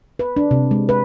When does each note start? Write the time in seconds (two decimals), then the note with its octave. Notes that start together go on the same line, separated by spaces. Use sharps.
0.19 B4
0.37 D4
0.51 C3
0.71 G#3
0.89 B4